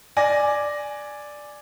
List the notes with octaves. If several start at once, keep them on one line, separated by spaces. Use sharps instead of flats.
D5 G#5 A#6